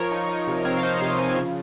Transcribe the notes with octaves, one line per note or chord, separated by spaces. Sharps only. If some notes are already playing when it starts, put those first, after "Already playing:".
Already playing: F3 A#4 C#5
D#4
D#4
C3
C4 A#4 C#5
F5
D#4 C5 D#5
C3 C#5 F5
F3 F5 G#5
C#3